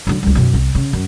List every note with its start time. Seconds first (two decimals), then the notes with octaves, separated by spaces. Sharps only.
0.07 D3 F#3
0.23 C#2 G3
0.35 F#2 B2
0.54 C2
0.75 C#3
0.93 F#2